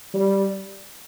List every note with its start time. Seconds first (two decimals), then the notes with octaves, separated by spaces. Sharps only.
0.14 G3